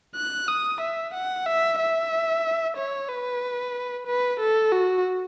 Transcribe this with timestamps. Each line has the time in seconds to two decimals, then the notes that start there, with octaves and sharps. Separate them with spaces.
0.16 F#6
0.48 D#6
0.81 E5
1.14 F#5
1.46 E5
1.79 E5
2.77 C#5
3.09 B4
4.07 B4
4.40 A4
4.72 F#4